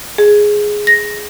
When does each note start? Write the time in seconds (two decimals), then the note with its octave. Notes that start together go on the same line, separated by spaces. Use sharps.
0.18 G#4
0.87 A#6